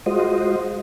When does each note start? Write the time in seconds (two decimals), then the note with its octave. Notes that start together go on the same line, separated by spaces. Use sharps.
0.06 G#3 F4 F#4 C5 D#5